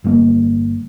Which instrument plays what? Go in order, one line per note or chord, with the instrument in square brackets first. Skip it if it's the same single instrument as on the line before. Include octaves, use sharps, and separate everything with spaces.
[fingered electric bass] G1 G3 A#3